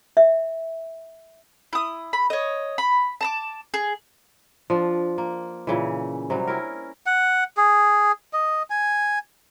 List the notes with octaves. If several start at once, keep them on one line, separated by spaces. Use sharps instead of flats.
E5
E4 D#6
B5
C#5 D#5
B5
A5 A#5 D6
G#4
F3 D4
A#3
A#2 C#3 E3
C3 F#3 G3
C#4 E4 A#4
F#5
G#4
D#5
G#5